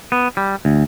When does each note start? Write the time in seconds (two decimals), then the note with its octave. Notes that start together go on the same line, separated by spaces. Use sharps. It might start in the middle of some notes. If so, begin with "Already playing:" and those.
0.12 B3
0.37 G3
0.65 D2